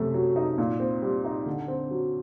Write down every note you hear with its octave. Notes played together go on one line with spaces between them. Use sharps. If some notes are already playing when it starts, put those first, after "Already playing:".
Already playing: F#2 C3 A3
F#3
D#4
A#2
C4
G3
D#4
D3
C4
F#3